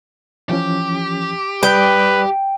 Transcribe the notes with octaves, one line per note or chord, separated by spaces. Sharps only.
E3 F3 C#4 G4
G3 B4 D5 G5 D#6